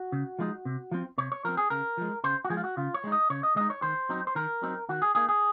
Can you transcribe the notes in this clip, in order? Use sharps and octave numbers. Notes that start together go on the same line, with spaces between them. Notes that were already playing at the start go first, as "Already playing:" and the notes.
Already playing: F#4
C#3
F3 G#3 D#4
C3
F3 C4
C3 C#5
C#5
F3 C4 A#4
G#4
C#3 A#4
F3 G#3
C#3 C5
F#4
F3 G#3 G#4
F4
F#4
C#3 F4
C#5
G#3 D#4
D#5
C#3 C#5
D#5
G#3 D#4 D#5
C#5
D#3 C5
F#3 C4 D#4
C5
D#3 A#4
F#3 C4 D#4
D#3 F#4
G#4
A#3 D#4 G#4
G#4